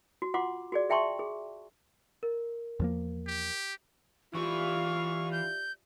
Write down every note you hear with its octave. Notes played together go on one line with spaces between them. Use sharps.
F#4
F4 F#5 C6 D6
F#4 G#4 D5
G#4 E5 G5 A5 C6 C#6
G#4
A#4
E2 F3 A#3
G4
E3 F4 G4 D5 E5 F5 C#6
G6